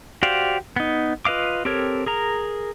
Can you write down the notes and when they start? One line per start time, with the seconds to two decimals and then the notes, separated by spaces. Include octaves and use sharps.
0.23 F#4 G4 C5 D5 F5
0.76 B3 D#4
1.25 F4 B4 D#5 F5 D6
1.65 C4 G4 A4 A#4 C#5
2.06 G#4 A#4 A#5